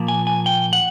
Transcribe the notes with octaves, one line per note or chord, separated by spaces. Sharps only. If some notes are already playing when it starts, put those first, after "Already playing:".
Already playing: A#2 F3 A#3
G#5
G#5
G5
F#5